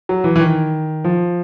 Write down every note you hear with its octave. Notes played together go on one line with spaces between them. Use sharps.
F#3
E3
E3
D#3
F3